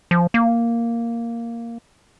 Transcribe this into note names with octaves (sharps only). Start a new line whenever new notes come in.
F3
A#3